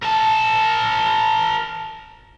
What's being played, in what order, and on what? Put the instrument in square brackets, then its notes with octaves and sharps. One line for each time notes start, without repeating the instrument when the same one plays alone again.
[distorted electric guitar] A#4 A5